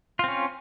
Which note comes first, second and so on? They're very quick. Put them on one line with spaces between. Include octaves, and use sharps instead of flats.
F4 C4 C#4